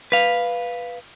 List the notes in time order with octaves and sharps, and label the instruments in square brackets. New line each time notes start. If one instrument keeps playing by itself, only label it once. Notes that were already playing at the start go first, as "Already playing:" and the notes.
[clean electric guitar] B4 F5